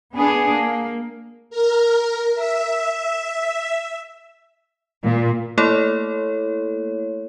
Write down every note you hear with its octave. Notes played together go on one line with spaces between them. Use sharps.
B3 D4 G#4
A#3
A#4
E5
A#2
A3 A#3 E4 A4 C#5